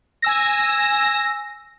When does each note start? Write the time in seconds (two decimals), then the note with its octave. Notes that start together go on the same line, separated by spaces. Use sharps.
0.22 G#5 E6 A#6